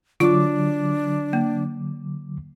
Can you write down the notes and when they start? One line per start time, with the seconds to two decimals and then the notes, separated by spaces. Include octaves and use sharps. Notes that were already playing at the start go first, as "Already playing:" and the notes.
0.20 D3 F#3 D4 F4 D6
1.33 A#3